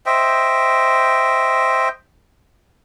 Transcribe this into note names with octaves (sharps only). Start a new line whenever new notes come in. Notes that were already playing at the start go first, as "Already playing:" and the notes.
C5 D#5 E5 G5